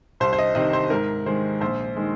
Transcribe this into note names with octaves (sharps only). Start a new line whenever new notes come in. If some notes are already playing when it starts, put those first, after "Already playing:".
C2 C5
C5
D#5
C3 D#3 C4 D#5
C5
G#2 A#4
D#3 G#3 C5
A#1 C5
D#3 G#3